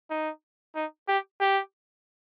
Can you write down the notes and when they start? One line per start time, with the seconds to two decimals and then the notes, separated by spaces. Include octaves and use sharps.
0.10 D#4
0.75 D#4
1.08 G4
1.41 G4